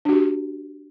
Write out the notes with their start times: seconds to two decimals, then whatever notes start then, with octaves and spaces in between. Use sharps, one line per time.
0.05 D4
0.09 F#4
0.12 G4